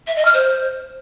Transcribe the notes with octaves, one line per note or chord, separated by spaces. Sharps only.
E5
D#5
F6
C5